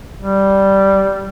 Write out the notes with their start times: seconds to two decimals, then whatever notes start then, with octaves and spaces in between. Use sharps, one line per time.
0.18 G3